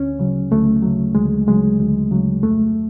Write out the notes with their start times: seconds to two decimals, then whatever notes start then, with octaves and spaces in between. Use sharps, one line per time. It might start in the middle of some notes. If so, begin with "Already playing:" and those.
Already playing: D2 C#4
0.19 C#3 F#3
0.51 D2 A3
0.83 C#3 F#3
1.15 D2 G#3
1.47 C#3 F#3 G#3
1.80 D2
2.11 C#3 F#3
2.43 F2 A3